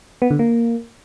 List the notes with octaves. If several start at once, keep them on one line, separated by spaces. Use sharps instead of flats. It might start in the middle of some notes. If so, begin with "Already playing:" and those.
B3
D3
A#3